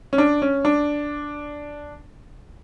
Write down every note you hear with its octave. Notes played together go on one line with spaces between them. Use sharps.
C#4
D4
C#4
D4